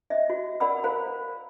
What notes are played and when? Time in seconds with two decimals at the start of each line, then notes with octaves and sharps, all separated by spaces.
0.10 D#5 E5
0.30 F#4
0.60 A#4 D5 F#5 B5 E6
0.84 A#4 C5 F5 A#5 B5